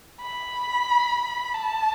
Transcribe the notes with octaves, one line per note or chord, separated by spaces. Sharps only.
B5
A5